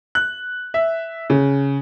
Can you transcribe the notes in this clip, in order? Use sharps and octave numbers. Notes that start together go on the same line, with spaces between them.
F#6
E5
C#3